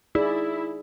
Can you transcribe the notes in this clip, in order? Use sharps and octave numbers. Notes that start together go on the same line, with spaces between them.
D#4 E4 G#4 D5